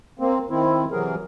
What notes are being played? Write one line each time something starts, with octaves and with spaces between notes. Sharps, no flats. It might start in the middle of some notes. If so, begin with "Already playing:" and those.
A#3 C4
D#3 C4 E4
C3 E3 F#3 G#4 A#4